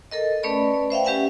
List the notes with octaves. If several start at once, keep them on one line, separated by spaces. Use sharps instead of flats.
A4 A#4 D#5
A3 C#4 B4 D5 B5
C5 E5 F5 G5
C#4 G4 B4 E5 F#5 G#5